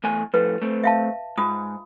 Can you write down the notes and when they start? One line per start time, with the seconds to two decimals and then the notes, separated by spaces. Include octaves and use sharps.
0.04 E2 A3 G#5
0.34 A2 F3 A4 B4
0.62 A3 C4
0.84 E5 F5 A5
1.38 G#2 F4 D#6